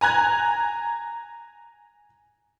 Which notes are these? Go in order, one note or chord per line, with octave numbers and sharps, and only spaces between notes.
G#5 A#5 F#6 G#6